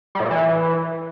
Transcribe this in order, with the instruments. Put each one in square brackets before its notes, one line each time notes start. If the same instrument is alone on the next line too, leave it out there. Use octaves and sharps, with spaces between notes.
[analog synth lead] G3
A2
A#2
E3